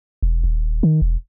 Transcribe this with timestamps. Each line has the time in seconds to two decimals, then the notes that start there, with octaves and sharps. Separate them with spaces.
0.23 E1
0.44 D#1
0.83 D#3
1.02 E1